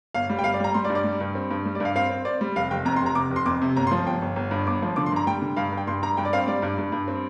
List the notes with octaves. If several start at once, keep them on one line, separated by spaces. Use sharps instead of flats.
G1 F5
G3
G5
G1 F5
D5
G3 A#5
G3 C6
D5
G2
D5
G3
G2
C4
G2
G3
D5
G2 F5
C4 F5
C4
C4 D5
G3
F1 F5
F1 G5
F2 A#5
C6
F1 A#5
C3 D6
F1
C6
F2 D6
C3
G1 A#5
C6
F3
G1 G5
G1
G1
G2
G1 D6
F3
D3 D6
C6
G2 A#5
G3 G5
D3
G2 F5
G2
G5
G2 C6
G2 A#5
G2 G5
D5
C4 F5
G3 D5
G2
G2
G2
C4